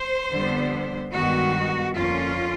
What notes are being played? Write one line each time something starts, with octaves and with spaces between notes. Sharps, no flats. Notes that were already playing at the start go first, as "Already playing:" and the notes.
Already playing: C5
F2 D3 G3 B3
G2 D#3 G#3 B3 F#4
F2 D3 F3 A#3 C#4 F4